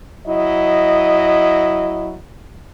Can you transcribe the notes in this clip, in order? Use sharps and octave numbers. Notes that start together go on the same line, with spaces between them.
F#3 E4 D#5